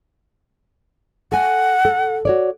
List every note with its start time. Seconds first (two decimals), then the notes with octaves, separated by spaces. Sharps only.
1.32 A4 F#5 G#5
1.85 A4
2.25 F#4 C#5 D5